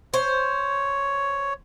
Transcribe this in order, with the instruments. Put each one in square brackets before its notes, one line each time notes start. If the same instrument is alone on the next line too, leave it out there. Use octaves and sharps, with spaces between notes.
[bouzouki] C5 [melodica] C#5